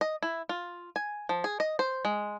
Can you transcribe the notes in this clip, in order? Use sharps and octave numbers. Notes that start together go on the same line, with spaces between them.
D#5
E4
F4
G#5
F3
G#4
D#5
C5
G#3